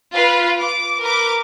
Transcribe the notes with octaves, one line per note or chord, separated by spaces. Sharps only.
F4 B4 F5
D6
A#4 B4 D6